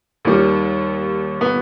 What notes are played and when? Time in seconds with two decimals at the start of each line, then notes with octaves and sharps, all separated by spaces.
0.25 D#2 D#3 G3
1.41 B3